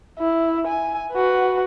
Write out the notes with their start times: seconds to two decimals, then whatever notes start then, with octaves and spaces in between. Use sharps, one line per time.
0.19 E4
0.67 G#5
1.12 F#4 B4